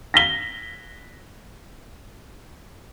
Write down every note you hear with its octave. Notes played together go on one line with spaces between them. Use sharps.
A#6 B6 G7